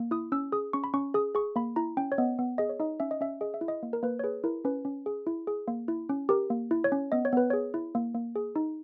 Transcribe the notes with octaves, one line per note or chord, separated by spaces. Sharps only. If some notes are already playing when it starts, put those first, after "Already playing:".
Already playing: A#3
E4 D#6
C#4 E6
G#4 D#6
C#4 C#6
B5
C#4 C#6
G#4 D#6
G#4 C#6
A#3 B5
E4 A#5
C#4 G5
C#5
B3 D#5
B3
G#4 D#5
C#5
D#4 D#5
C#4 E5
D#5
C#4 E5
G#4 D#5
E5
E4
D#5
A#3
A#4
A#3 B4
C#5
G#4 B4
E4 A#4
C#4 B4
C#4
G#4
E4
G#4
A#3
E4
C#4
G4 A#4
A#3
E4
C#5
C#4
B3 D#5
C#5
B3 B4
G#4 C#5
E4
A#3
A#3
G#4
D#4